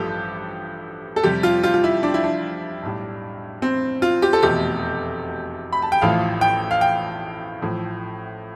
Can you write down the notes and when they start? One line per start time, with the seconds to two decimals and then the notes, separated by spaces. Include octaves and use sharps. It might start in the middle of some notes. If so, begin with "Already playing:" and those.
Already playing: A1 G2 F3 A3 G4 A4
1.16 A4
1.23 F2 C3 G3 G4
1.43 F4
1.63 F4
1.74 F4
1.84 E4
2.03 D4
2.14 E4
2.24 D4
2.83 B1 A2 G3
3.62 C4
4.02 F4
4.22 G4
4.33 A4
4.42 F1 E2 B2 A3 G4
5.73 B5
5.82 A5
5.92 G5
6.01 A1 A2 F3 A3 F5
6.41 G5
6.71 F5
6.81 G5
7.61 A1 A2 F3 A3